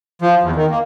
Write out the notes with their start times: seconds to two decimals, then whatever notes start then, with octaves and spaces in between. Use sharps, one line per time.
0.22 F3
0.43 E2
0.56 D#3
0.70 A#3